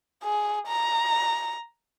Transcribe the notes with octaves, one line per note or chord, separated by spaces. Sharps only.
G#4
A#5